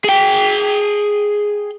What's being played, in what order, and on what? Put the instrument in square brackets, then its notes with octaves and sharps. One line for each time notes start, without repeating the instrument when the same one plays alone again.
[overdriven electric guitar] G#4 G5